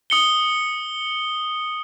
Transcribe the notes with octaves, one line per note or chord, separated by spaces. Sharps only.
D#6 C#7 G7